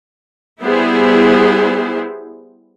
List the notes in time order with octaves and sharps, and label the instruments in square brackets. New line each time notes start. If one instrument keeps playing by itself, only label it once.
[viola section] G3 B3 E4 G#4 C5